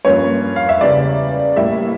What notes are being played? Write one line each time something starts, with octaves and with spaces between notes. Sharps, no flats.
G2 F3 A#3 C#4 C#5
F5
E5
E2 C#3 G3 D5
A2 G3 A#3 E5